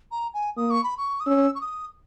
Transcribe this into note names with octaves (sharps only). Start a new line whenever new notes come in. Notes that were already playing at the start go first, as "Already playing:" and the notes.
A#5
G#5
A#3 D#6
C#6
B5
C#6
D#6
C#4 E6
C#6
D#6